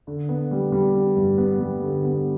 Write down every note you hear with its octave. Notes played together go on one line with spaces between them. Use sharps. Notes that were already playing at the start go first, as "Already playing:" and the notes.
D3
B3
G3
G3
B3
G2
B3
G3
D3
B3